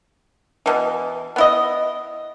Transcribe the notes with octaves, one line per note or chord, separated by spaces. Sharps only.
B2 E3
B3 E4 D#5